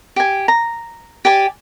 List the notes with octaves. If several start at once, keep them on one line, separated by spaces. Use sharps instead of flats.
G4 G#5
A#5
G4 D5 G#5